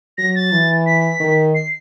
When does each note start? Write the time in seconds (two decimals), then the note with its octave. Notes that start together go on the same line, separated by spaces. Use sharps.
0.18 F#3 A#6
0.35 A6
0.52 E3
0.86 B6
1.20 D#3
1.55 C7